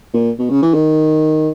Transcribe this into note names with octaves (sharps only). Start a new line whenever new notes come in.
A#2
B2
C#3
E3
D#3